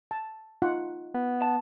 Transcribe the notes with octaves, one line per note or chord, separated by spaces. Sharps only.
A5
D#4 F4 F#5
B3
A5